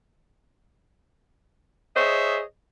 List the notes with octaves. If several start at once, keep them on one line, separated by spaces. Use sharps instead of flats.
G#4 C5 C#5 D#5 E5